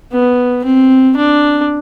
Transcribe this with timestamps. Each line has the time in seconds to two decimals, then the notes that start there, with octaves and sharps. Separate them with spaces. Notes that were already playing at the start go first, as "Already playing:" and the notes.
0.12 B3
0.64 C4
1.16 D4